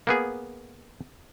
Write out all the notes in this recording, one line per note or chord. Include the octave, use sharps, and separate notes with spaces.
A#3 B3 G#4